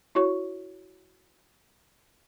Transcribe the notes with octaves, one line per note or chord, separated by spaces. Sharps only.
E4 F#4 C#5 C#6